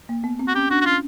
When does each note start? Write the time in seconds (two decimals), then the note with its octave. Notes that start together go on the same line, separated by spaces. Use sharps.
0.09 A#3
0.24 B3
0.39 C4
0.48 F#4
0.55 C#4 G4
0.70 D4 F#4
0.81 F#4
0.86 C#4 F4